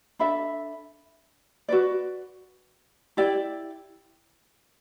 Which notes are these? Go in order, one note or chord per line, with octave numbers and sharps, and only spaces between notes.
D4 A4 E5 B5
F#4 B4 D5
E4 G4 D5 G5